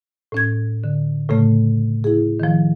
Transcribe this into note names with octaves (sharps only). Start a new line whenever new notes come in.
A2 C#4 G#6
D3
A2 C#3 A3
E4 G#4
D#3 F3